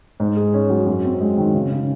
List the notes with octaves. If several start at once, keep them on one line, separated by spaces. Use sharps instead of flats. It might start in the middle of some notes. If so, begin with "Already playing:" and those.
G#2
G#4
C#4
F#3
F#2
C4
G#3
D#3
C#3
C#3